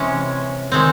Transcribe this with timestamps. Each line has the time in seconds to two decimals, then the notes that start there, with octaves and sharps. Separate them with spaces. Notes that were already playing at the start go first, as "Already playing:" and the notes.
Already playing: C3 E3 G#3 C#4
0.72 D#3 G#3 C4